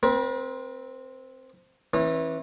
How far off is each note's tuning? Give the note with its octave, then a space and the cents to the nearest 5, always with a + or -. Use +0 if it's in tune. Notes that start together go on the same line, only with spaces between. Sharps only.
C4 +0 B4 -45
E3 -15 C#4 -45